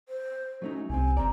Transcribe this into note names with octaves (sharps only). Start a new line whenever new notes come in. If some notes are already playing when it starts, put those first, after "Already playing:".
C5
F#3 A3 C#4 D#4
C2 C3 C4 G#5
G1 C4 D5 A#5